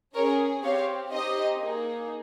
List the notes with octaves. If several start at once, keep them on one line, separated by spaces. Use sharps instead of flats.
C#4 G#4 A#4 C#5
C4 G4 C#5 F5
C4 D#4 G4 C5 D#5
A#3 D#4 G#4